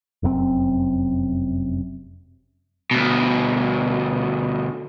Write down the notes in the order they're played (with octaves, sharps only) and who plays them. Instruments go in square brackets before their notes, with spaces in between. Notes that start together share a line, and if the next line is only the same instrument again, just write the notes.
[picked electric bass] F1 F#2 B2 C4
[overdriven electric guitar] D2 B2